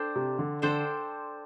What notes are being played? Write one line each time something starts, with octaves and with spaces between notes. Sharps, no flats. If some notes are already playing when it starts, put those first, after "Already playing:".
Already playing: D4 A4 C5 G5
C3
D3
D3 D4 A4 C5 G5